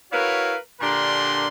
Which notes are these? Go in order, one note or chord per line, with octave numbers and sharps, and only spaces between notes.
E4 F#4 A#4 B4 C#5 F5
A#2 D3 D4 G4 A#4 C6